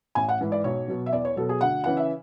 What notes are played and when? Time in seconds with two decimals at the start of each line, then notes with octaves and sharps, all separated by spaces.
0.15 A1 G#5
0.29 F#5
0.41 G#2 E3
0.52 D5
0.64 B1 C#5
0.88 B2 F#3
1.06 E5
1.13 E2 D5
1.25 C#5
1.36 B2 F#3 A4
1.49 G#4
1.61 D2 F#5
1.84 C#3 E3 F#5
1.97 E5